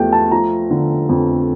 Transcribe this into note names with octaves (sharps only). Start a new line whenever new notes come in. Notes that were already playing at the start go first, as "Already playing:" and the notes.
Already playing: E2 F3 A3 G4 G5
A5
F3 A#5
D3
F2